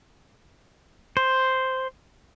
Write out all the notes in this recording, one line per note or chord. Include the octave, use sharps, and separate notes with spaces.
C5